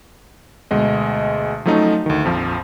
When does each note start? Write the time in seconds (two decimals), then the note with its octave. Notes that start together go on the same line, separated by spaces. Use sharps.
0.71 D2 B2 G#3 D#5
1.65 F3 F#3 A3 C#4 D#4
2.06 D2 D#3
2.25 A#1 F2 F3